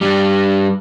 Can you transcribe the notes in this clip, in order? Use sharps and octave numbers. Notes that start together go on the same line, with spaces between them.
G2 G3